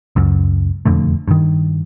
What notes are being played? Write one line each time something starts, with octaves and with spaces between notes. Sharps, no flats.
C#2 F#2
E1 F2 D3 A3
G2 D#3